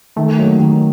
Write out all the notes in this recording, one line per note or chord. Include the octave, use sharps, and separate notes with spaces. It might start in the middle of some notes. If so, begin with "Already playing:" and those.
D#3 A3
F#3 A#3 D#4
D#3